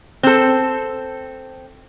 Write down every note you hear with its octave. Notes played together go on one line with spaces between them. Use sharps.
C4 A4